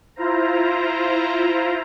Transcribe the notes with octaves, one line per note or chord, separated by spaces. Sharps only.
E4 F4 C5 A#5